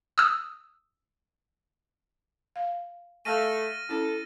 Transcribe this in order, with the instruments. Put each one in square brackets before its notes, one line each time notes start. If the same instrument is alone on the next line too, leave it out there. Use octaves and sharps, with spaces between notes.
[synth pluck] D#6 E6
[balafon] F5
[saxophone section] A3 [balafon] F5 G#5 [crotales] F6 A#6 D#7
[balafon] C#4 E4 [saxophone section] A4